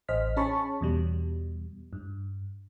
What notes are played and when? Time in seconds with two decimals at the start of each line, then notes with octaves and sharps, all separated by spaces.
0.09 A1 C5 D#5 F6 B6
0.36 C#4 G#4 C#5 A5 B5 C#6
0.81 E2 B2 G3
1.93 G2